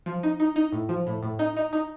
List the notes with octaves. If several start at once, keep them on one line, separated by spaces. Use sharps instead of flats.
F3
D#4
D#4
D#4
A2
F3
A2
A2
D#4
D#4
D#4